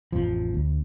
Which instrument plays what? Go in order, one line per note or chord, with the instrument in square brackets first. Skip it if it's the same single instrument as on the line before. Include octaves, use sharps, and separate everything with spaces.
[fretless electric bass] A1 F2 F3
D2